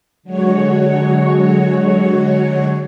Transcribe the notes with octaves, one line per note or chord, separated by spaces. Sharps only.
D3 F#3 G#3 F#4 C#5